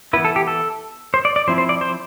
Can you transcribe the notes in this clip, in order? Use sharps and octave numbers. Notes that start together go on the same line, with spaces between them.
E3 B3 E4 B4
A4
G4
A4
C5
D5
D5
F3 C4 E4 C5
C5
D5
C5